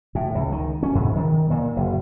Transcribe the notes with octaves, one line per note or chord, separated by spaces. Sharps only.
A2
C#2
D#3
C#4
G#2
D#3
A#2
F#1